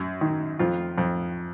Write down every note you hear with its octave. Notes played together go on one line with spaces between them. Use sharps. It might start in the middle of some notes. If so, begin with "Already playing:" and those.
Already playing: F#2
D#3
F2 F4
F2